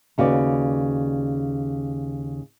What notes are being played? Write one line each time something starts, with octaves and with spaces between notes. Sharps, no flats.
D#2 C#3 F#4 B4 D5